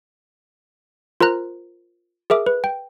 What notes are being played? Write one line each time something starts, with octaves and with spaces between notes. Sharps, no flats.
F4 A#4 C5 A#5 F#6
G#4 A#4 E5 D6
B4
G5